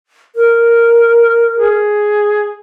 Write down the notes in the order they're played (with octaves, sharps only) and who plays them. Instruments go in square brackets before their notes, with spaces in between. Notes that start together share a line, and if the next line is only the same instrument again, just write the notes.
[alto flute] A#4
[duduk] G#4